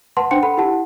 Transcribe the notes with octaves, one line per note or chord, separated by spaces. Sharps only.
B4 F#5 A5 C6
D4 C5 F#5 G5 C6 C#7
A4 F#5 B5
E4 G4 F#5 A5